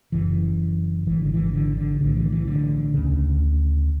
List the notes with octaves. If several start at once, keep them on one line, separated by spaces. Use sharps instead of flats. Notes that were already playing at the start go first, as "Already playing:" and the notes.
F#1 F#2 C#3 E3
G#1 G#2 E3
D3
E3
D3
D3
B1 A2 D3
E3
E3
D3
D2 C#3